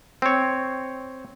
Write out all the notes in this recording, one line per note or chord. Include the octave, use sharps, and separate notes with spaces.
C4 C#5